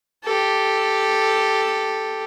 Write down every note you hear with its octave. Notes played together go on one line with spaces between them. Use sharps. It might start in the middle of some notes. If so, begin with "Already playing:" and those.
G4 A4